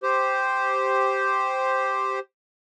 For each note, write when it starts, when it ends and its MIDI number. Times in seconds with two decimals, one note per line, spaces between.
0.03 2.19 67
0.03 2.19 72